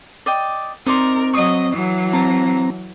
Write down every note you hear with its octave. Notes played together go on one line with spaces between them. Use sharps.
D5 D#5 G5
C4 D#4 A#4 D5 C6
F#3 D#5 C#6 D#6
E3 F#3
C4 A5 A#5